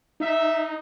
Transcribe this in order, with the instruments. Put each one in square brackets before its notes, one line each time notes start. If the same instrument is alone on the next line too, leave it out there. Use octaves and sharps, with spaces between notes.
[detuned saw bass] D#4 [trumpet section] E5